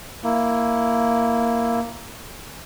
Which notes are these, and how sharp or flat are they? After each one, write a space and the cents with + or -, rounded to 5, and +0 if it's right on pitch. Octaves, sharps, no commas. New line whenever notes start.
A#3 +0 E4 +5